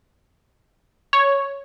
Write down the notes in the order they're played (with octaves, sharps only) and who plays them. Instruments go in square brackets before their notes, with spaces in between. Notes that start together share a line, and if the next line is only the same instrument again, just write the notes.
[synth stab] C#5